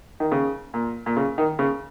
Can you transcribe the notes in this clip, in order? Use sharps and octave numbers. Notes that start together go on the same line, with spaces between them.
D#3
C#3
A#2
A#2
C#3
D#3
C#3